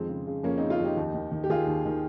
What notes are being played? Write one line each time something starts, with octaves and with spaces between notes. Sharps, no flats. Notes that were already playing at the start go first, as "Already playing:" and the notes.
Already playing: F2 D#3 G#3 C4
C#3
C#3
F2 A#3 C#4
C#3 C4 D#4
C#4 F4
F2 D#4 G4
D#2
D#3
D#3
G4
D#3 F4 G#4
D#2
D#3